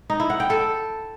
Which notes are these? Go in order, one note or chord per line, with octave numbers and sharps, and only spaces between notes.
D#4
E4
F#5
G5
A4